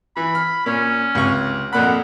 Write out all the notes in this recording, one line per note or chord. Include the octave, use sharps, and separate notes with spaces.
E3 B5
F6
A#2 C#4
C#2 C3 C#6
F2 A#2 F#5 B5